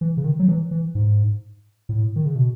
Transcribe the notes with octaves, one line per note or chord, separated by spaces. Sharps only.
E3
C#3
D#3
F#3
E3
E3
G#2
A2
D#3
C#3
B2